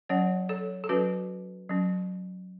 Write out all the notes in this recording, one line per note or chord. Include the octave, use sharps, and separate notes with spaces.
F#3 C#4 C#5 F#5
A4 C#5
A4
F#3 C#4 F#4 B4
F#3 C#4